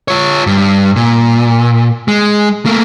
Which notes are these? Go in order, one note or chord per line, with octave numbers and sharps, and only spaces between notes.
F4 C#5
G2
A#2
G#3
A3 A#3